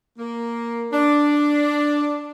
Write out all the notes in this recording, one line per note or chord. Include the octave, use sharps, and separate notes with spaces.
A#3
D4